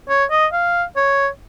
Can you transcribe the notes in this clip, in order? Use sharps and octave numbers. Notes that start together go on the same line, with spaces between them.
C#5
D#5
F5
C#5